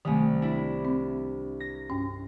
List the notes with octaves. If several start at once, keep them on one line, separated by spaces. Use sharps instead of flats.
C2 D#3 F#3 G3 A3
D4 E4
C4
A#6
G2 C#4